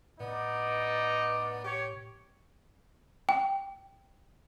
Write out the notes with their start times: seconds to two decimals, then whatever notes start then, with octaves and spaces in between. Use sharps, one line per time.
0.20 A2 B3 D#4 D5
1.64 G4 C#5
3.29 G5